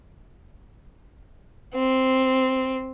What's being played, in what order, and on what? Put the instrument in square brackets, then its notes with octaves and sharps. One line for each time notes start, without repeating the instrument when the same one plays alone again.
[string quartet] C4